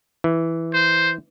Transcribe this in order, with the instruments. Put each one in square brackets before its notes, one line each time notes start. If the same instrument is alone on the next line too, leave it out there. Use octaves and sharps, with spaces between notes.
[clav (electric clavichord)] E3
[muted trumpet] C5